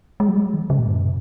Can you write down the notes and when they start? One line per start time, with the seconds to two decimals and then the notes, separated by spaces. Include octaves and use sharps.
0.20 G#3
0.28 F#3
0.37 G#3
0.45 F#3
0.53 D#3
0.70 C#3
0.79 A#2
0.87 F#2